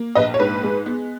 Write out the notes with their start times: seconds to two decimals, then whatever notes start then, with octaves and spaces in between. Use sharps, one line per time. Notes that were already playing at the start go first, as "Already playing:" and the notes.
Already playing: A#3
0.15 A#1 B4 D#5
0.34 C#5
0.39 G#2 B4
0.63 G#3
0.86 B3